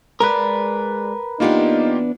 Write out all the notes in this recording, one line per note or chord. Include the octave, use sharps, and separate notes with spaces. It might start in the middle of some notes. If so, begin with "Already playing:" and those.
G#3 A#4 B4 D5
E3 A#3 B3 D4 D#4 F4 G4